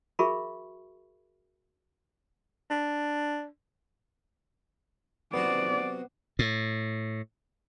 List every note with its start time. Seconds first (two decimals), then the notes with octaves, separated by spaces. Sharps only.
0.19 F#4 G#4 A#4 E5 B5 C#6
2.70 D4
5.34 C3 F#3 B3 F#4 D5
6.39 A2